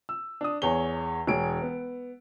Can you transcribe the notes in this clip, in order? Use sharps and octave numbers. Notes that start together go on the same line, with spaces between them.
E6
D4 D#6
E2 G#4 C#5 G7
E1 G#4 C#5 D7
B3